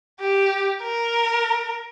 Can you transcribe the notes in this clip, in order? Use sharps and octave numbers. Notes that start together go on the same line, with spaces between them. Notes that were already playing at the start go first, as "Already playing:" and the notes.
G4
A#4